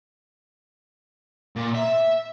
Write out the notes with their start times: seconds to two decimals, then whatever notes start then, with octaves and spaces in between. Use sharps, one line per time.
1.56 A#2
1.75 E5